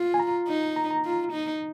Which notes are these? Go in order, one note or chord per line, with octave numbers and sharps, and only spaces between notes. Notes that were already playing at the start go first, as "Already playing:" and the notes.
Already playing: F4
G#5
A#5
D#4
A#5
A#5
F4
D#4